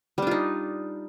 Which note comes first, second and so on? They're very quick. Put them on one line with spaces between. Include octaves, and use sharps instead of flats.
G3 D4 F4 D#4